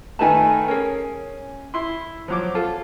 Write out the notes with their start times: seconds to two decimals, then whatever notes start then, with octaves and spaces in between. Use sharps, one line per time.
0.19 D#3 A3 B4 G#5 A5
0.68 C#4 G#4 A#4
1.74 E4 C6
2.28 F3 F#3 D6
2.55 F4 A4